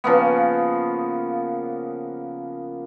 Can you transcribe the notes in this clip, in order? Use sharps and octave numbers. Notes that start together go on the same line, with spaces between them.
C#3 F3 A#3 B3